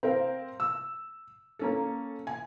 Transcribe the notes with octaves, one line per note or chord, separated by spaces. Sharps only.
C4 A#4 F5
E6
A#3 C#4 A4
G#5